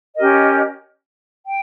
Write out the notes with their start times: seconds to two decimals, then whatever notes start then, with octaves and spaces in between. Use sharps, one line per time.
0.15 C#4 G4 A#4 D#5
1.46 G5